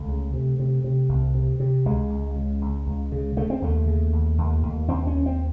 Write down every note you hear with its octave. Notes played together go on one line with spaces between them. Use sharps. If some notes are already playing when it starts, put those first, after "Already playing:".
Already playing: C#2 A3
C#3
C3
C3
C3
C2
C3
C3
C#2 G#3
C#2
C#3
C#2
C#2
C#3
C#3 A3
C4
D#2 A3
C#3
D#2
D#2
D#2
D#2 C4
C#4
D#2
C4